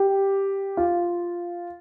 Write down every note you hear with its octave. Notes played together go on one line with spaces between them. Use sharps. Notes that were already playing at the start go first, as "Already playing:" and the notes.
Already playing: G4
F4